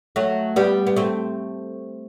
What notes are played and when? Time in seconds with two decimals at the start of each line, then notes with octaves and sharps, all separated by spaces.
0.16 F#3 A3
0.56 G3 B3
0.87 B3
0.97 A3 C4